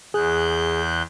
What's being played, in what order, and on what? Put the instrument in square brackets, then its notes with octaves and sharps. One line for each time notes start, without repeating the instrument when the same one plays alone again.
[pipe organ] E2 F#6 G6 [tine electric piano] G#4